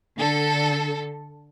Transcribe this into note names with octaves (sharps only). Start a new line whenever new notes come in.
D3 A4